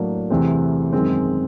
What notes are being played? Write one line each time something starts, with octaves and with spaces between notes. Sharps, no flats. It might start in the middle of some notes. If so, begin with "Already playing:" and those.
Already playing: A2 F#3 A#3 D4 F#4
E2 C3 E3 A3 C4
F#2 D#3 G#3 C4